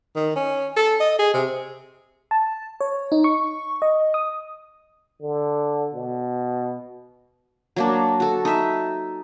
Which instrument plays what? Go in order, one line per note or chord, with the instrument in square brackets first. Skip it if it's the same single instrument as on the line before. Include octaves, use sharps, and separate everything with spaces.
[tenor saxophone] D#3
C#4
A4
D#5
G#4
C3
[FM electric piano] A5
C#5
D#4
C#6
D#5
D#6
[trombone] D3
B2
[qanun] F#3 A#3 D4
F#4 A4
D#4 E5